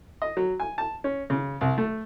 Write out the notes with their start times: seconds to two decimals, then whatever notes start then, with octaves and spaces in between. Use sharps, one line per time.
0.22 D#5
0.37 F#3
0.60 G#5
0.78 A5
1.04 C#4
1.30 C#3
1.61 C2
1.78 A3